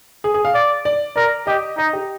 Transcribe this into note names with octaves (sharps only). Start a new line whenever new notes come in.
G#4
G#4
F5
D5
D5
A#4 D5
G4 D#5
D#4 D#5
G4